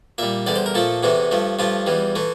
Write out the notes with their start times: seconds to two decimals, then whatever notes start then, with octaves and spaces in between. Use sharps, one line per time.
0.18 A#2 G3 E5
0.46 E2 D3 G3 D5
0.56 C5
0.66 A#4
0.75 A#2 F3 A3 A4
1.03 E2 C3 E3 A3
1.32 G2 F3 A3
1.59 G2 F3 A3 F4
1.86 E2 E3 G3
2.16 E3 A3